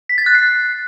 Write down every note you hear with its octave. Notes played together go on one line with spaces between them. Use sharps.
B6
A6
F#6
C7